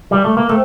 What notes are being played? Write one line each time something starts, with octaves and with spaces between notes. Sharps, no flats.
G3
A3
A#3
A3 C4